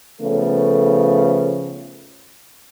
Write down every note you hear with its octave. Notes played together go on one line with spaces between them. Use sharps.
C#3 F3 A3 B3 A4